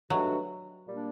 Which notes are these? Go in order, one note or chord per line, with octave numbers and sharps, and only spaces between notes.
G2 D#3 F#3 A3 D4 F#4
A#2 G3 A#3 D4